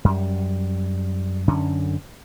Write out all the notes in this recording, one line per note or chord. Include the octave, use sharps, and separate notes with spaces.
F#2 G3
F#2 D3 C#4